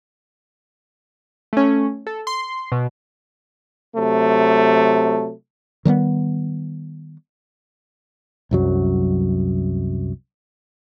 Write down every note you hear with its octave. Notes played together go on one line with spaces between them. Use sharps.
A3 C#4
A4
C6
B2
C3 F#3 A3
D#3 G3 G#3 B3
C2 F#2 F#3